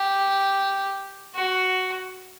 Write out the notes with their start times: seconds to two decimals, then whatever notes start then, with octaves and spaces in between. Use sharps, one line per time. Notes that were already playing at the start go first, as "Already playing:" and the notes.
Already playing: G4
1.35 F#4